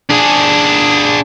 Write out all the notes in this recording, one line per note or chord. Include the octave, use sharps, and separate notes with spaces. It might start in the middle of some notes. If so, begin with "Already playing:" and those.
D4 G#4